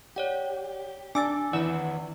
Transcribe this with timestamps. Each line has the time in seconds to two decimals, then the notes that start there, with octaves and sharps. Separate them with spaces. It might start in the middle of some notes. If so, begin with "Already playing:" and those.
0.16 G4 C#5 D5 F#5
1.15 D4 G#5 D6 E6 A6
1.53 D#3 E3 E4 D5 F#5 E6